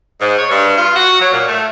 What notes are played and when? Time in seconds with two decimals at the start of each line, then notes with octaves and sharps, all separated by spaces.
0.21 G#2
0.38 C#5
0.51 G2
0.77 F4
0.96 F#4
1.20 F#3
1.33 A#2
1.47 A3